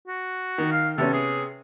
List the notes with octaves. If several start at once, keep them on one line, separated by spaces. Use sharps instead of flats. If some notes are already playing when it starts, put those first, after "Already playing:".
F#4
D#3
F5
C3 B3 C#4 A4
G#4